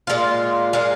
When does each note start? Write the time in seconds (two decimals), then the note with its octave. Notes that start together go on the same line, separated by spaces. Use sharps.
0.07 A#2 G#3 F4
0.73 A#2 G#3 F4